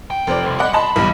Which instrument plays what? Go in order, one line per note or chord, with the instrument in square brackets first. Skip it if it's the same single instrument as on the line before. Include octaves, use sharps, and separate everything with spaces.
[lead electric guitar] F2 G5
[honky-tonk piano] F1 C5 D5
[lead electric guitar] C2
[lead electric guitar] G3 [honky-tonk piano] D5 D#5 F#5
[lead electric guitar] C#3 B5 [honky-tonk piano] D#5 A5 C6
[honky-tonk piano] B1 E2 G3